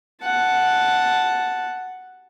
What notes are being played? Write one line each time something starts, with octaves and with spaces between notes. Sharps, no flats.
F#5 A5